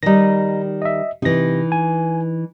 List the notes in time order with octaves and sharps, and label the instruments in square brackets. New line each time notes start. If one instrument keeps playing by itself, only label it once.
[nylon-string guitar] D#3 G3 [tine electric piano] D#4 A#6
[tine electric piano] D#5 E5
[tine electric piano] C3 A#6 [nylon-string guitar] E3 D#4
[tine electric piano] G#5